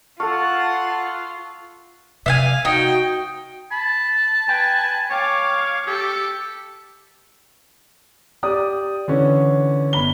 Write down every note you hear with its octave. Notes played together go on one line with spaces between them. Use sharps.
F4 A4 F5 F#5 A5 C#6
C3 D4 E5 F5 G#5
A3 D#4 F#4 G5
A5 B5
B4 G5 G#5
C#5 F5 D6
G4 A4 C#7
G4 D5 D#6
D3 E3 C#4
G1 B5 G7